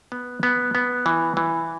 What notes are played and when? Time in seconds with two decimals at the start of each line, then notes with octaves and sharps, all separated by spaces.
0.12 B3
0.43 B3
0.75 B3
1.06 E3
1.37 E3